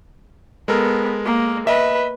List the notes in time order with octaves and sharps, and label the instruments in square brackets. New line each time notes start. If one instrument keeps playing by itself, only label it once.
[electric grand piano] G#3 A4 A#4 [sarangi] B3
[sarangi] A#3
[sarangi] B4 [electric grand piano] D#5 E5